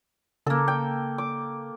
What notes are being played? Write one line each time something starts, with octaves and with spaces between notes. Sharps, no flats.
C#3 A#3 A4
G5
D6